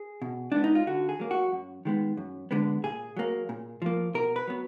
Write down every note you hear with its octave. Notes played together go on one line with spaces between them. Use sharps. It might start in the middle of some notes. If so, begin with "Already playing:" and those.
Already playing: G#4
B2
G#3 B3 D4
D#4
F4
D3 F#4
G#4
F#3 A#3
F#4
F#2
D#3 G#3 B3
F#2
D3 G#3 B3
A#2 G#4
F#3 A#3
A#2
F3 A#3
B2 A#4
B4
F#3 B3